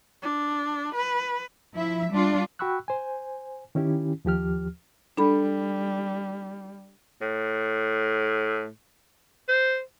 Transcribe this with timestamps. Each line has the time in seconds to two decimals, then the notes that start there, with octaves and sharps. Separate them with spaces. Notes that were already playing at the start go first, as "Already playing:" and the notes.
0.22 D4
0.95 B4
1.74 F3 E4 E5
2.11 G3 D4 F4
2.59 F#4 G5 B5 C#6 E6 F#6
2.88 C5 G#5
3.75 D#3 C#4 E4 G4
4.25 D#2 F3 G4 F6
5.17 G3 D4 A4 B5
7.22 A2
9.49 C5